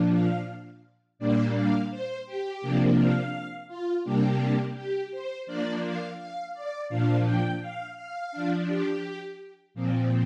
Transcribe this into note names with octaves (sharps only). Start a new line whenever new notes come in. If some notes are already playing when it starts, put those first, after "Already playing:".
Already playing: A#2 F3 D4
F5
A#2 G3 A#3 D4 D5
F5
C5
G4
C3 F3 A#3 D4
F5
F4
C3 G3 A#3 D4 G4
G4
C5
F3 A#3 D4 D5
F5
F5
D5
A#2 F3 D4 F5
G5
F5
F5
F3 D4
G4
A#2 F3 C4